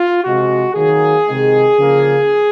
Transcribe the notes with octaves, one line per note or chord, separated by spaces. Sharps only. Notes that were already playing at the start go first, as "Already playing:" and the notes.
Already playing: F4
C3 F3 G#3 F#4
D#3 F#3 A#3 G#4
C3 D#3 G#3
C#3 F3 A#3